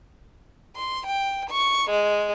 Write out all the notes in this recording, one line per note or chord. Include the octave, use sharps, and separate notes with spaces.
C6
G5
C#6
G#3